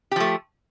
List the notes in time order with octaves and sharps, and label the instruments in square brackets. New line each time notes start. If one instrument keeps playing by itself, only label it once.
[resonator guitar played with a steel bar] G4
F3
A3